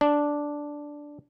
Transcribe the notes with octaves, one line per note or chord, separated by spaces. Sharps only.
D4